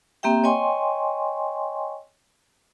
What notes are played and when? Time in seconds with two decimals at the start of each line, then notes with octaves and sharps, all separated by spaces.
0.23 A#3 C4 G4 E5 G5
0.44 C#5 D#5 G5 G#5 C6 C#6